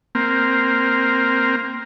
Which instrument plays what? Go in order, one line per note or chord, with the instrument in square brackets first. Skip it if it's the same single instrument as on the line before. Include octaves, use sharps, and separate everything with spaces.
[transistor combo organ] A#3 C4